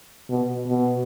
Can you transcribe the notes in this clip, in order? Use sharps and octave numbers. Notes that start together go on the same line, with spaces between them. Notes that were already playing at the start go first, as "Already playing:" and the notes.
B2
B2